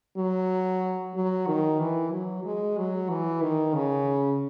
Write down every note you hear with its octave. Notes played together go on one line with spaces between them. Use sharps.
F#3
F#3
D#3
E3
F#3
G#3
F#3
E3
D#3
C#3